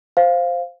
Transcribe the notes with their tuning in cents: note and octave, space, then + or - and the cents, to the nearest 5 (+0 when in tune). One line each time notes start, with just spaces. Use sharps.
C5 +0 F5 +0